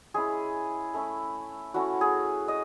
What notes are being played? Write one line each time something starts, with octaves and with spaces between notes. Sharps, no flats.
G#3 C#4 E4 G#4
A3 C#4 E4
A3 C#4 E4 F#4
G#4
D#5